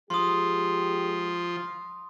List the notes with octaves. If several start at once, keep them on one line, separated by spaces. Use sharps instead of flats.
F3 G#3 G4 G#4 C6 D#6